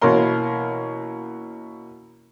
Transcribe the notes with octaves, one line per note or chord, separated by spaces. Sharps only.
B2 E3 A#3 C#4 A#4 C6